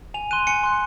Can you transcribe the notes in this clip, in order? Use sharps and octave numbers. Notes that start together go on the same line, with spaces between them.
G#5 F7
C6 F#6 D#7
G#5 C#7
C6 F#6